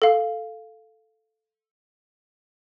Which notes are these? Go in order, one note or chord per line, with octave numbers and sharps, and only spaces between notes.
A4 F5